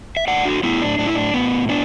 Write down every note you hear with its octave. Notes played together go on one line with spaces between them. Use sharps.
E5
A2 D5 F#5
D4 F#4
A2 B3 E4
D4
A2 D4
E4
D4
A2 B3
B3 D4